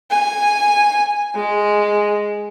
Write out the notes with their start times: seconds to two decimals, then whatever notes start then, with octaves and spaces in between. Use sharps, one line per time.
0.11 G#5
1.35 G#3